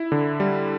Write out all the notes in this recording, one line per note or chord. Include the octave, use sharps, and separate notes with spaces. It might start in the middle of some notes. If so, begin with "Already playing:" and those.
Already playing: E4
D3
G3